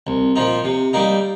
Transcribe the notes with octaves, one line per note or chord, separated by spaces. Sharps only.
C2
A#2 F3 D#4
C3
G3 A#3 D#4